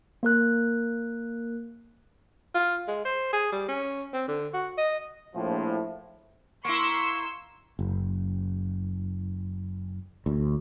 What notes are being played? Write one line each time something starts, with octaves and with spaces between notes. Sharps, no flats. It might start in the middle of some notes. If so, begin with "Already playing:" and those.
A#3 A#4 F#6
F4
G#3
C5
G#4
G3
C#4
C4
D3
F#4
D#5
A#1 A2 F3
A#3 E4 C6 C#6 E6
F#1
D2